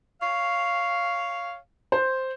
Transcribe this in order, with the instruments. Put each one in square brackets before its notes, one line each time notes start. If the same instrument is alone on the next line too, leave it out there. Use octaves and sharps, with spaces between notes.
[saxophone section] C#5 F5
[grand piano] C5